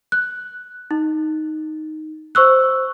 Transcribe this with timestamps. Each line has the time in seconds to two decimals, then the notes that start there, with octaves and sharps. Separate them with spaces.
0.12 F#6
0.91 D#4
2.35 C5 C#6 E6 F#6